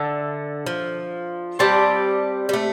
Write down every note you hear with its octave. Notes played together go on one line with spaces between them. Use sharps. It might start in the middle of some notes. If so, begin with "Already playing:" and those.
Already playing: D3 D4 A4 E5 A5
F3
G3 C4 G4 D5 A5
G3
A3